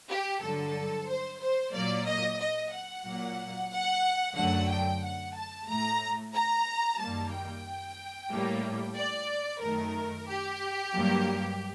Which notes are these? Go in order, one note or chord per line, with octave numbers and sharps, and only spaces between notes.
G4
G2 D3 F#3 A4
C5
C5
A#2 F#3 A#3 D5
D#5
D#5
F#5
A#2 F#3 A#3
F#5
F#2 D3 F#3 A3 F#5
G5
F#5
A5
A2 A3 A#5
A#5
F#2 D#3 G3 A#3 A5
G5
A2 G3 A#3
D5
F#2 D#3 A3 A#4
G4
G2 F#3 A#3